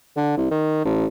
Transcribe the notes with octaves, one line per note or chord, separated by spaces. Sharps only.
D3
C2
D#3
A1